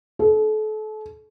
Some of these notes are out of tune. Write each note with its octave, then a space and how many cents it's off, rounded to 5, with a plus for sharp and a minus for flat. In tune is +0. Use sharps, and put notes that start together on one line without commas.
A4 -35